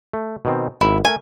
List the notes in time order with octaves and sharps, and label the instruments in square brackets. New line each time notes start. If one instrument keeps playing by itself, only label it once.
[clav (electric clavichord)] A3
B2 D#3 C4
[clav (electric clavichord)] G#1 [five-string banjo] E4
[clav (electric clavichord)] A3 A#4 [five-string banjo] G#5